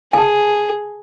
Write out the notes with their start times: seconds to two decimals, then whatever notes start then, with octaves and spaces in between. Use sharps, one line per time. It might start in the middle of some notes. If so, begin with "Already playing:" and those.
0.13 G#4 G#5 A5